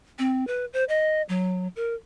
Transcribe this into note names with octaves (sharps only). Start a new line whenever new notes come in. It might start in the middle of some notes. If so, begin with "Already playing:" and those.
C4
B4
C5
D#5
F#3
A#4